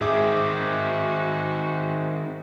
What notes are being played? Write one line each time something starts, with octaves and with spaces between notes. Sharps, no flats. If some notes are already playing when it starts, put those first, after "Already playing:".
G#2 D#3 C4 F#4 G#4 E5 D6